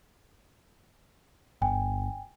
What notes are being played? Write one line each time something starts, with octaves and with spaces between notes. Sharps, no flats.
G1 G5 G#5